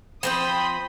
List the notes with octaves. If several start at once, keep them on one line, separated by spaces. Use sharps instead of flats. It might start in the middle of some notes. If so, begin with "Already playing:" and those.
F3 C4 G5 B5 C6 D#6